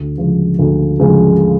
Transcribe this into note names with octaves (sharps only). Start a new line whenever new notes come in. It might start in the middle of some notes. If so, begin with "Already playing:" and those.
Already playing: D2
C#3 F3 G#3
D2
C#3 F3 G#3